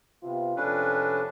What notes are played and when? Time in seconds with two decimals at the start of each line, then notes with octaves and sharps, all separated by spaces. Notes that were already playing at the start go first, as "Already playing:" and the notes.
0.22 C3 B3 F4
0.56 F2 C3 C#4 D4 A4 B4